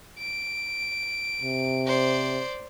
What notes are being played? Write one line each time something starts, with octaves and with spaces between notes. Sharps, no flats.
D7
C3
C5 D5